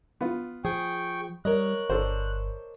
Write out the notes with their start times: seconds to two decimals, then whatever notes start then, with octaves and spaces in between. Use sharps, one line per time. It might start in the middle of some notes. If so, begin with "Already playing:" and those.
0.21 B3 F4
0.65 F3 G#4 G5 C#6
1.45 G3 A#4 C#5 D#5 F#6
1.90 G1 D4 A4 C5